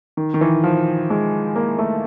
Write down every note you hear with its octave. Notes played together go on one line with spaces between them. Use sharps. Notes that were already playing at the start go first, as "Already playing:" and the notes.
D#3
D#3
E3
F3
G#3
A#3
A3